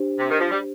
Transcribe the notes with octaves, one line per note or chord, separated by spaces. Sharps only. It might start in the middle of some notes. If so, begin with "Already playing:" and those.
Already playing: D4 G4 C5
C3
D#3
F3
G3